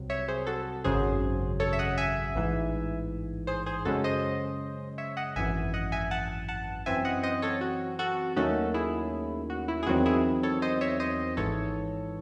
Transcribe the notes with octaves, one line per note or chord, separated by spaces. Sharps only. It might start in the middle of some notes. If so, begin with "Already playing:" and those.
Already playing: C2 C3 F#3
C#5 E5
G#4 C5
F#4 A4
G#1 F#2 C#3 F#3 G#4 C5
A4 C#5
E5
D#5 F#5
E5 G#5
A1 G#2 E3
G#4 C5
G#4 C5
F#2 C#3 G#3 C#4 F#4 A4
C5 D#5
C#5 E5
D#5 F#5
G#1 F#2 E3 E5 G#5
D#5 F#5
E5 G#5
F#5 A5
F#5 A5
F#2 E3 C4 E5 G#5
D#5 F#5
C5 D#5
A4 C#5
F#4
F#4 A4
D#2 D#3 F#3 A3 C#4 F#4 A4
E4 G#4
F#4
E4
G#4
E2 D#3 F#3 C4 F#4
E4 G#4
A4 C#5
C5 D#5
C#5 E5
C5 D#5
G#1 G#2 E3 A4 C#5